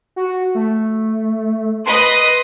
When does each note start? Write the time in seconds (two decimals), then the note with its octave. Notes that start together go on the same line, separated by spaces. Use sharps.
0.16 F#4
0.55 A3
1.86 B4 D#5 C6 D#6